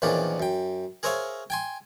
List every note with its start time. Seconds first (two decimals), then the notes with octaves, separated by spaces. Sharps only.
0.02 E2 A#2 D#3 F3 C#4 D4
0.40 F#2 G5
1.03 G#4 A#4 C5 C#5 E5 F5
1.50 G5 G#5 C6